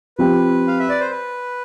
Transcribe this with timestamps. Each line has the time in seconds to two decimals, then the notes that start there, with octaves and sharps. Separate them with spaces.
0.18 F3 C4 G4 B4
0.68 F5
0.79 E5
0.89 D5
1.00 C5
1.11 B4